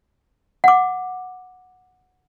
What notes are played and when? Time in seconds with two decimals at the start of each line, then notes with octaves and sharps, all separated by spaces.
0.64 F#5 D6